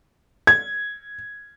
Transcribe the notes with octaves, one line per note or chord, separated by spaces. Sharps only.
G#6